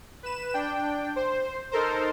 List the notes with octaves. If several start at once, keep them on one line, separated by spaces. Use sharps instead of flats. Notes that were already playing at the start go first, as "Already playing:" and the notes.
B4 E7
D4 G5
C5
D#4 A4 A#4 C5